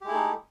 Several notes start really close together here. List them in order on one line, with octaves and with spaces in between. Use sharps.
G4 G#3 E4 A3 D#4